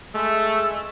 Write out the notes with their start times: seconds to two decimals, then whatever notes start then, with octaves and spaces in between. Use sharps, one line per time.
0.15 G#3 A3 E6